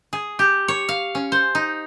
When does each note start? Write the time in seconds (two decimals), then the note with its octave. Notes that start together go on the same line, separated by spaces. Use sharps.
0.13 G#4
0.39 G4
0.68 C#5
0.89 F5
1.15 C#4
1.32 C5
1.55 D#4